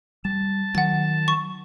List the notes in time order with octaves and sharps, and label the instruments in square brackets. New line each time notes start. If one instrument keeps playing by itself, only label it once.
[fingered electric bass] G3 [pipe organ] A5
[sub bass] D#3 [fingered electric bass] F#3 [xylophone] F#5 A6
[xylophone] C#6